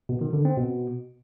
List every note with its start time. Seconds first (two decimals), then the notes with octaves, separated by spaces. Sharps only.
0.09 B2
0.21 D#3
0.33 D3
0.45 C4
0.57 B2